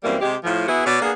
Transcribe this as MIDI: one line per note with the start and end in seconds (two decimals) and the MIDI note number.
0.04 0.17 42
0.04 0.17 52
0.04 0.17 55
0.04 0.17 58
0.04 0.17 60
0.21 0.35 48
0.21 0.35 56
0.21 0.35 67
0.43 0.67 45
0.43 0.67 53
0.68 0.84 59
0.68 0.84 64
0.68 0.84 66
0.68 0.84 68
0.86 0.99 47
0.86 0.99 71
0.86 0.99 73
0.86 0.99 74
1.01 1.11 58
1.01 1.11 59
1.01 1.11 62
1.01 1.11 68